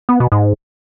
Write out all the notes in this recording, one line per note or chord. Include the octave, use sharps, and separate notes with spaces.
B3
B2
G#2